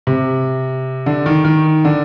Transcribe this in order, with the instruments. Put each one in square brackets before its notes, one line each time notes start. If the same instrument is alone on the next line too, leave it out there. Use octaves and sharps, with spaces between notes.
[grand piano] C3
D3
D#3
D#3
D3